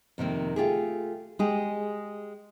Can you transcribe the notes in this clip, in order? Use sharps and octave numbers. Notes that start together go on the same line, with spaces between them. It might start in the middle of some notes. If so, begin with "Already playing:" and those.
F2 C3 D#3 A#3
A3 F4 G4 G#4
G#3 G4 G#4